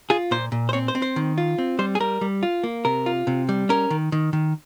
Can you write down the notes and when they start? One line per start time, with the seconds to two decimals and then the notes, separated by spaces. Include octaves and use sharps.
0.10 F4 G#4
0.31 A#2 C5
0.52 A#2
0.69 C5
0.73 C4 C#5
0.88 C5
0.95 C4
1.02 C5
1.16 D#3
1.38 F4
1.58 C4
1.79 G3 C5
1.95 G#4
2.00 G3 A#4
2.21 G3
2.43 F4
2.64 A#3
2.85 C3 A#4
3.06 F4
3.27 C3
3.49 G3
3.69 C#4 A#4
3.90 D#3
4.12 D#3
4.33 D#3